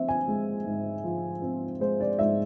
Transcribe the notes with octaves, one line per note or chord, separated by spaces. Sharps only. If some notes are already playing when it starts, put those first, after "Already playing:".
Already playing: F3 C4 E5
G#5
G#3
G#2
F3
C4
G#3 C5
D5
G#2 E5